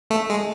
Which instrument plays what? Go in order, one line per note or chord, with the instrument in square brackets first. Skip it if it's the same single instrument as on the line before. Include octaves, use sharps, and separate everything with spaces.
[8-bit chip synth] A3
G#3